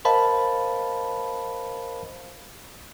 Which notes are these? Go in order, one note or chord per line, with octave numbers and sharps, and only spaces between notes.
A#4 C5 D#5 F5 A5 B5